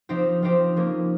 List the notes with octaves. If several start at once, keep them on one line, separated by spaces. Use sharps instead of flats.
F3 C4 D#4 G4 C5
F3 C4 D#4 G4 C5
F3 A#3 C#4